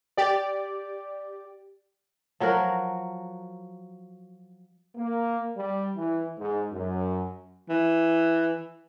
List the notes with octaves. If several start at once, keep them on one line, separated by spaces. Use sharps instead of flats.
G4 D5
F3 F#3 F#4 A#4
A#3
G3
E3
G#2
F#2
E3